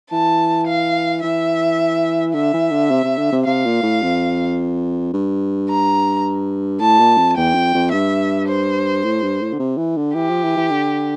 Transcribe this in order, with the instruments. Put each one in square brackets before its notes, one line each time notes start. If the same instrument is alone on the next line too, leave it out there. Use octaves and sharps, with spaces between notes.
[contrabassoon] E3 [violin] A5
[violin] F5
[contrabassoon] E3 [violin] E5
[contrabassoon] D3 [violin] E5
[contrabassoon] E3
D3
C3
C3
D3
C3
[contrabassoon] C3 [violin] F5
[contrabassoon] A#2
A2
F2
G2
[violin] A#5
[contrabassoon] A2 [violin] A5
[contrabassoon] A#2
F2
[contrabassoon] E2 [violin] G5
[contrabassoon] F2
F2
[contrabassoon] G2 [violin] E5
[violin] C5
[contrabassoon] A2
G2
A2
D3
C3
E3
D3
[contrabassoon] E3 [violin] G4
[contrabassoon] F3
E3
E3
D3